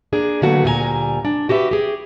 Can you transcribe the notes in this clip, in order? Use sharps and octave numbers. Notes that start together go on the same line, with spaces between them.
A#3 D4 G#4
D3 F#3 A3 A#3 F#4 B4
D2 A#2 G3 F4 G#5 A#5
D4
F#4 G4 B4 E5
G4 G#4